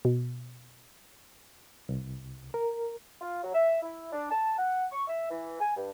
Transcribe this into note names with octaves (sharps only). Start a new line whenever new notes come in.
B2
C2
A#4
F4
F#3
E5
E4
D4
A5
F#5
C#6
E5
E3
G#5
G2